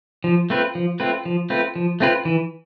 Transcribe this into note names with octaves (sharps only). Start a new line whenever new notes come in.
F3
A3 C4 F4 B4
F3
A3 C4 F4 B4
F3
A3 C4 F4 B4
F3
A3 C4 F4 B4
E3